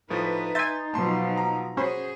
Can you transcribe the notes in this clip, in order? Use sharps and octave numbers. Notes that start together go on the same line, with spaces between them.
A2 F3 D#4 B4
E5 G#5 C6 G6 A6
B2 F3 F#3 A5 C6
A#5
C#4 F#4 G#4 C5 B5